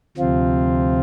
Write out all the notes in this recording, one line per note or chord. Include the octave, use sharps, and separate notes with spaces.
D2 C3 F3 C4 F4